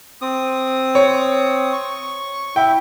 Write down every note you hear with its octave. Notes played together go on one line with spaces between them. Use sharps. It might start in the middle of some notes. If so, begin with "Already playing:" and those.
C4 D#6
C#5
C#6
E4 G5